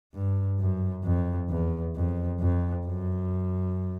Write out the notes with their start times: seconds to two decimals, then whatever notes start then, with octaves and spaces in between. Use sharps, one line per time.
0.14 G2
0.59 F#2
1.04 F2
1.49 E2
1.96 F2
2.40 F2
2.86 F#2